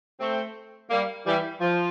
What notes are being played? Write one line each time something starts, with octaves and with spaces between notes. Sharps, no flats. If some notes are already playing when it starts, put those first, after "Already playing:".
A3 C4
G3 A#3
E3 G3
F3